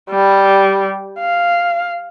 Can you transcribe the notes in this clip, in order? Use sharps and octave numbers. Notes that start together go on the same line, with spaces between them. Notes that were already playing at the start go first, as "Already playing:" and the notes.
G3
F5